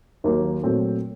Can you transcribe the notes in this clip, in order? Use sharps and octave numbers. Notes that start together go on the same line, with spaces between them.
D#2 D#3 F#3 A#3
A#2 F#3 A3 C4